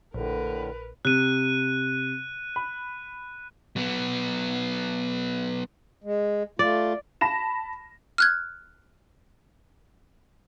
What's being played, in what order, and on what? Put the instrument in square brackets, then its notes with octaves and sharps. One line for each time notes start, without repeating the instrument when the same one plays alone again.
[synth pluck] A#1 [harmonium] A2 D3 [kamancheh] A#4 B4
[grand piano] C3 [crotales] F#6 D#7
[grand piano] B5
[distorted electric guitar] F#3 B3
[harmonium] G#3
[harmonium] A3 F4 [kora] D5
[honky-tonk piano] A5 B5 A#6 E7
[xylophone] F6 F#6 G#6